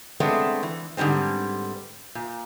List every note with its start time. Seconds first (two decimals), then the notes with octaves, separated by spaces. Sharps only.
0.20 G#3 A3 B3 C4 D4
0.63 E3
0.97 G#2 D3 G3 B3 C4
2.15 A#2